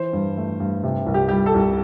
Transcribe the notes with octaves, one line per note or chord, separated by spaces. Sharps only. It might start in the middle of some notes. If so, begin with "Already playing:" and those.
Already playing: E3 C5
G2
A3
G2
C3
C2
G4
G3 G4
A4
C2